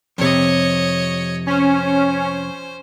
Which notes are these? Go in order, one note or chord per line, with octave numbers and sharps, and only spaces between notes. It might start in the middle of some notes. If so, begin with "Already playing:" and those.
F2 C3 C#5 D#5
C#4 C5